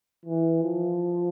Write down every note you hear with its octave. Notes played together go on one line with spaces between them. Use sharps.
E3
F3